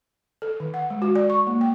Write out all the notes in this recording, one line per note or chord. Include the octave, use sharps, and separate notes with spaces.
A4
D#3
F#5
G#3
F#4
D5
C#6
A#3
G5